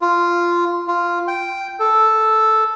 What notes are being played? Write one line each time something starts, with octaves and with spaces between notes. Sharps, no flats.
F4
F4
G5
A4